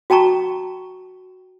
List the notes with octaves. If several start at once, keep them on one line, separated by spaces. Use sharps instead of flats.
F#4 G5 A5 A#5 C#6